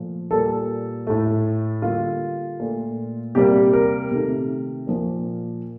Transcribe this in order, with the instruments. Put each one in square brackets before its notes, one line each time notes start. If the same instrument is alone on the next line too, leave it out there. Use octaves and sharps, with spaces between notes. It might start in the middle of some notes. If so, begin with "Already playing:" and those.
Already playing: [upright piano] A#2 F3 A3
A#2 G3 A#3 A4
A2 A3
D3 G3 A#3 F4
A#2 A3
C3 G3 A#3 G4
A#4
C3 D#3 A3
A#2 F3 A#3